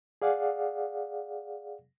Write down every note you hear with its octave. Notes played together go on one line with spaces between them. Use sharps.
G#4 D5 F5 F#5